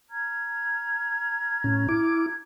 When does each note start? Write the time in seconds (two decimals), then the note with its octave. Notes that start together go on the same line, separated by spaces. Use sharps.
0.09 A#5 F6 G#6
1.64 A2 C#4
1.89 E4 D6